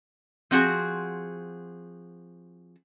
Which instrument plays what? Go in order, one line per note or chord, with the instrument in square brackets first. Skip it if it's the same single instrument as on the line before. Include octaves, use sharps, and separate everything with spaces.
[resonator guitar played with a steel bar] F3 C4 F#4 G#4